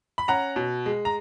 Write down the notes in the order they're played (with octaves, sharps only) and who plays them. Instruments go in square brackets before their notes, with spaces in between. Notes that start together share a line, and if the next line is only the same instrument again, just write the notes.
[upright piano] B5
C#4 F#5 A#5
B2
G#3
A#5